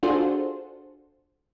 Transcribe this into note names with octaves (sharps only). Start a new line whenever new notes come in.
D4 F4 F#4 G#4 A4 C5